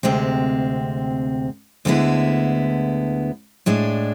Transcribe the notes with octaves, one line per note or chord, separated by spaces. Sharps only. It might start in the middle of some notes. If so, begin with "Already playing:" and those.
D2 C3 G#3 C4
D2 D3 G#3 B3 E4
A2 G#3 D4